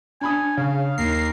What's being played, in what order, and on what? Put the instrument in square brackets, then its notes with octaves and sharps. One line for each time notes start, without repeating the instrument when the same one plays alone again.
[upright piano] D4 B5 D#6 [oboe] G#5
[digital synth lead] C#3 [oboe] F5
[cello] D#2 [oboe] A#4 [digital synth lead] C7